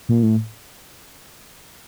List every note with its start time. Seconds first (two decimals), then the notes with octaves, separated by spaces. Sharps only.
0.09 A#2
0.23 A2